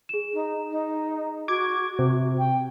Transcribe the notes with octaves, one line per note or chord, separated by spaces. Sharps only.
G#4 E7
D#4
D#4
F#4 D6 G#6
C3
G5